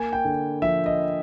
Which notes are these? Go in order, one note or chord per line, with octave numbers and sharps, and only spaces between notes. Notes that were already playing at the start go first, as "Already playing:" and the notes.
Already playing: A#3 G#5
G5
D3
F3 E5
D#5